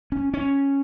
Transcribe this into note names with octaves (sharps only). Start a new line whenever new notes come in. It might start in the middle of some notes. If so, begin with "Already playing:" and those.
C#4
C#4